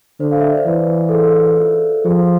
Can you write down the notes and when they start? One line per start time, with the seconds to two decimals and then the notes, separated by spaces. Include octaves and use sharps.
0.20 D3 C5
0.31 F5
0.40 E5
0.50 D5
0.58 C5
0.66 E3 B4
1.09 A4
1.12 G#4
1.59 F4
2.05 F3 G#4